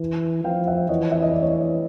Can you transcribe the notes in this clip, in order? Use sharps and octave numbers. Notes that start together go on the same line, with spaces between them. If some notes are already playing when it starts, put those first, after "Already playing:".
Already playing: E3
F3 F5 G5
E5 F#5
E3 C#5 D#5
E5
D#5
D5
C#5 D#5